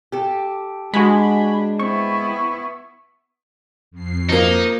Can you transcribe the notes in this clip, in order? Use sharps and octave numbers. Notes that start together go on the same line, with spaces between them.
G4 A4
G#3 D4 F#4 G#5 B5
B3 C4 E4 C#6
F2 C7
F3 A#3 D#4